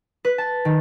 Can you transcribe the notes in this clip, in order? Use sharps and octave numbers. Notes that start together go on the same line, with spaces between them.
B4
A5
D#3